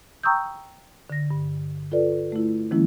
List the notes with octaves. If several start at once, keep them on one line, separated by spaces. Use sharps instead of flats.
G5 A#5 C#6 D#6 E6 G6
D3 A#6
G2
F4 A4 B4 D5
A3 E4
D#3 F3 G#3 A#3 C#4 E4